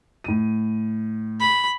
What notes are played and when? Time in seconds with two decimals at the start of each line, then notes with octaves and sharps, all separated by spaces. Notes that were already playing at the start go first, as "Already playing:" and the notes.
0.24 A2 D#7
1.40 B5